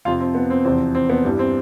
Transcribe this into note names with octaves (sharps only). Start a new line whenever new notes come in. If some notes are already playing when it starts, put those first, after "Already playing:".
F2 C3 F3 F4
C4
B3
C4
E2 C3 F3 C4
C4
B3
G2 E3 G3
C4